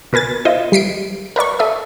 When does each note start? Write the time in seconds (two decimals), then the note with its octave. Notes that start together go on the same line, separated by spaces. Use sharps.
0.13 B2 A#4 B4 G#5 A6
0.45 E4 F4 C5 D#5
0.72 G3 B6 C7 D7
1.36 A#4 B4 D5 C#6
1.59 A4 E5 D#6